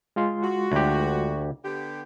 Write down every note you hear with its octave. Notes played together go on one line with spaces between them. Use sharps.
G#3 F4 C6
F#4
D2 G4
D3 B3 G4